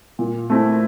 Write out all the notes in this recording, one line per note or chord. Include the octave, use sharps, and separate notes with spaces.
A#2
A3 C4 E4